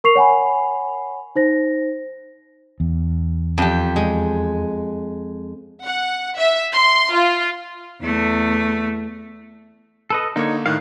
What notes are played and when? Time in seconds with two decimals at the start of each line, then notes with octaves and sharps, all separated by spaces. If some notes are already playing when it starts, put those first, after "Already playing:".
0.04 A#4 C#6 C7 F7
0.15 C#5 F#5 G#5 B5
1.36 D#4 C5 A#6
2.80 E2
3.58 F2 G4
3.96 G#3
5.83 F#5
6.36 E5
6.72 C6
7.14 F4
8.01 E2 A3
10.10 A4 B4 D#5
10.36 D3 A#3 D#4 C#5
10.66 A2 D#3 F5 F#6